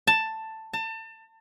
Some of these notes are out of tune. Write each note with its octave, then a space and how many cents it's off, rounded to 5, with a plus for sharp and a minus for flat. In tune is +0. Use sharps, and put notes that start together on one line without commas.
A5 +10
A5 +30